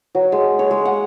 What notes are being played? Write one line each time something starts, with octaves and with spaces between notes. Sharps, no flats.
F#3
G#3
C#5
G#3
F#5